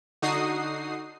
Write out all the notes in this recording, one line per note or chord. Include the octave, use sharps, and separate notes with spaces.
D3 D#4 F#4 D#6 C7